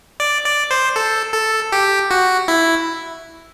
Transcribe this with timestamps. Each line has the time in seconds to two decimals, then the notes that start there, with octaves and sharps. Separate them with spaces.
0.20 D5
0.45 D5
0.71 C5
0.96 A4
1.34 A4
1.72 G4
2.11 F#4
2.48 E4